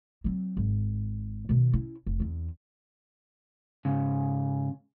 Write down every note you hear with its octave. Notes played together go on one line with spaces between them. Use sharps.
F#3 C4
G#1
B2 D#3
C#4 E4
F1
E2 C4
G#2 C#3